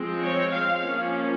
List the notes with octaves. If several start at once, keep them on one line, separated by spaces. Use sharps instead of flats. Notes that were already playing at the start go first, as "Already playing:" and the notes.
Already playing: F3 G#3 C4
C#5
F5
F3 A#3 C#4